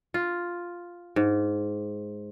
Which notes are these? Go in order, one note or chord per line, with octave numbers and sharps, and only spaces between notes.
F4
G#2